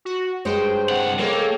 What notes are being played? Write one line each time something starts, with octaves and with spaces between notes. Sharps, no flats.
F#4
G2 G#3 C5 C#5 G5
C2 F#5
G#3 A#3 A4 C#5 G5